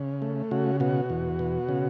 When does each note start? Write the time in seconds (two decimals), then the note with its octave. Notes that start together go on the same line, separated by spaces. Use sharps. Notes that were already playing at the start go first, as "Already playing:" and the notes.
Already playing: C#3
0.22 A3
0.51 C#3 F#4
0.80 B2 F#4
1.10 E2
1.39 B2
1.69 C#3